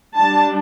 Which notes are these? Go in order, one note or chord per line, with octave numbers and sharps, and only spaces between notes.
G3 D4 A5